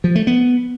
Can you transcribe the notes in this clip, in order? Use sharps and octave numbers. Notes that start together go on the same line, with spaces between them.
F3
A3
B3